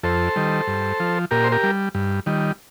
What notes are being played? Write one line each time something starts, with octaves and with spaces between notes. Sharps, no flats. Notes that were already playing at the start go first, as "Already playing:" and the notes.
F2 A4 C5
D#3 G3
G2
F3
A#2 G4 A#4
C5
G4 A#4
G3
G2
D#3 G3